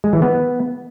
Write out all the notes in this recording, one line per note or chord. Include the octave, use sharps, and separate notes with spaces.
G#3
E3
B3